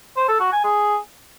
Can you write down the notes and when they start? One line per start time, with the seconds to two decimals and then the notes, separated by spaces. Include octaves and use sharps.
0.17 C5
0.28 A4
0.40 F#4
0.52 G#5
0.64 G#4